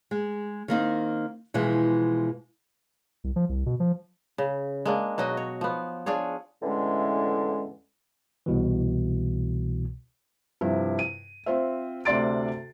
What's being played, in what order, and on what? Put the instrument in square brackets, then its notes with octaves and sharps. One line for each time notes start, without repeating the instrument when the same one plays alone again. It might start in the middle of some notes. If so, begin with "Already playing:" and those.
[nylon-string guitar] G#3
D#3 A#3 C4 D#4
B2 E3 F3 G#3
[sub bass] C2
F3
C2
B2
F3
[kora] C#3
G#3 A#3 D4
B2 F#3 F#4 D#5
C#5
F3 B3
D4 F4 G#4 C#5
[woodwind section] E2 A2 D3 E3 G#3 C#4
[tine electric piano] C2 B2 E3
[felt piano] G2 C3 F3 E4
D#7
C4 F4 C5 E5
D2 C3 D5 C6 A6 D7